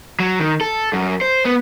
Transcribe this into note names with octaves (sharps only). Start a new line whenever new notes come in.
F#3
D#3
A4
F#2
C5
B3